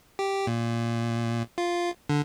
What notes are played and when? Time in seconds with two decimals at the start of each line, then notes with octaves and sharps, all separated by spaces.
0.19 G4
0.47 A#2
1.58 F4
2.10 D3